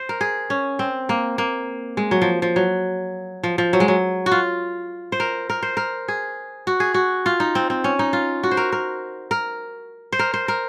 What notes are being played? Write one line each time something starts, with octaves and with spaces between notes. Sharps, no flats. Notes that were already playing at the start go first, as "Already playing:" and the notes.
Already playing: C5
A#4
G#4
C#4
C4
A#3
A#3
G#3
F#3
F3
F3
F#3
F3
F3
F#3
G#3
F#3
F#4
F4
C5
A#4
A#4
C5
A#4
G#4
F#4
G#4
F#4
F4
D#4
C4
C4
C#4
D#4
F4
F#4
C5
A#4
A#4
A#4
C5
A#4
C5
A#4